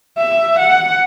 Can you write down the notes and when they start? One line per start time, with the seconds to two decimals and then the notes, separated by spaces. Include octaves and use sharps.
0.18 E5
0.59 F#5